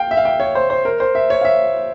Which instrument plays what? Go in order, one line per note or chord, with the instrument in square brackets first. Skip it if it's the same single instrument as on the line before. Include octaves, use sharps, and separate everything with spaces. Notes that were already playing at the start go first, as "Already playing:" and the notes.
Already playing: [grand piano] F5 G5
E5
F5
G5
C#5
C5
C5
A#4
C5
E5
C#5
F5
E5